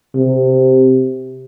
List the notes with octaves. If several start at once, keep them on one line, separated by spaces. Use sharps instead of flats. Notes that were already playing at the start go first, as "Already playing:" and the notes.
C3